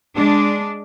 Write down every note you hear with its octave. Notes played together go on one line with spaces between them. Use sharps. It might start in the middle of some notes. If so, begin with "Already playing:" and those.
G#3 D4